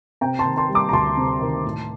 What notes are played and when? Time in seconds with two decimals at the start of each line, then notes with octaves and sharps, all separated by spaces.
0.21 C3 G5 A#5
0.39 A5 C6
0.45 D#3
0.57 A5 C6
0.69 G3
0.75 A#5 D6
0.89 A#5
0.92 D2 A5 C6
1.17 C3
1.41 D#3
1.65 A2